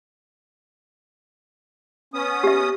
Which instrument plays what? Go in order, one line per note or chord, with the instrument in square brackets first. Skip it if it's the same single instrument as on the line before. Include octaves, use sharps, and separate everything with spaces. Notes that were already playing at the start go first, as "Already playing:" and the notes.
[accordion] B3 C#4 D#6
[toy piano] G4 E5